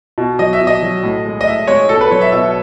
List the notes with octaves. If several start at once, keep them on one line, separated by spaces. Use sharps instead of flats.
B2
F#3 D#5
E5
B2
D#5
F#3
A2
G#3
D#5
A2 E5
G#3 C#5
B2 A4
B4
F#3 C#5
E5
B2 E5